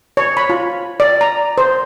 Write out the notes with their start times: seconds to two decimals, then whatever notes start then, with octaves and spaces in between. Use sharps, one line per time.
0.17 C#5
0.37 B5
0.50 F4
1.00 D5
1.21 A#5
1.58 C5